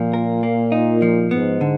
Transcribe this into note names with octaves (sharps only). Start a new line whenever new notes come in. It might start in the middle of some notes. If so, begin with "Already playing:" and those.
Already playing: A#2 F3
A#4
A#3
D#4
F3
G#2 B3
D3